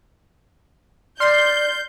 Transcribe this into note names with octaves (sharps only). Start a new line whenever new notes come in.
D5 C6 F6 G6 C7